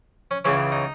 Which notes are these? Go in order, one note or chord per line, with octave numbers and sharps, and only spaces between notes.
C#4
C#2 C#3 E3 C#4
D#4